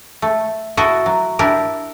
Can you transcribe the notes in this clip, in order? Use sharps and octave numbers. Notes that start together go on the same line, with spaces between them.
A3
E4 F#4 A4 D#5 E5
F#3
D4 E4 G4 A#4